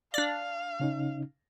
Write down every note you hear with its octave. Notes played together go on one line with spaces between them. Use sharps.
D4 D5 F5
C#3 C#4 D#4